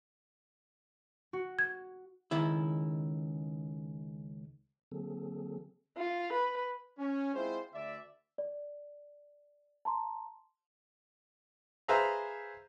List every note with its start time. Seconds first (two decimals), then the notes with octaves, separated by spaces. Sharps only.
1.33 F#4
1.59 G#6
2.31 C#2 D#3 E4
4.92 D3 F#3 A#3 C4 G#4 A4
5.98 F4
6.33 B4
6.99 C#4
7.35 G#3 C4 E4 F4 G#4 C5
7.74 D2 D5 E5
8.38 D5
9.85 A5 A#5 C6
11.88 G#4 B4 C5 E5 F5 A#5